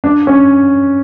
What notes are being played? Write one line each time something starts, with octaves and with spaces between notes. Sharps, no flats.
D4
C#4